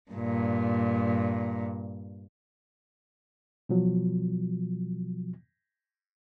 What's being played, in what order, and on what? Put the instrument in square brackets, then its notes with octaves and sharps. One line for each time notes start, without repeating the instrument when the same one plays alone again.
[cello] G2 A#2
[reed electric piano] B2 F3 F#3